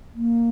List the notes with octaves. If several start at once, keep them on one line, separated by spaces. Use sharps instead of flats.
A#3